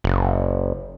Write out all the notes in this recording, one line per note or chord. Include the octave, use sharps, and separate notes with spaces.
F#1